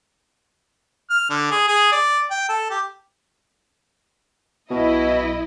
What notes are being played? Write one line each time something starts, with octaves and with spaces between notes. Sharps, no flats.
F6
D3
G#4
G#4
D5
G5
A4
G4
B1 B2 E4 D#5